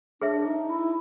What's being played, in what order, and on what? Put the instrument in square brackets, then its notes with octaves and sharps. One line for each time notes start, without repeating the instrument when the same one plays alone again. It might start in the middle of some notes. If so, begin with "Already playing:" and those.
[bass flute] D4 [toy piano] G#4 C#5 E5
[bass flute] D#4
E4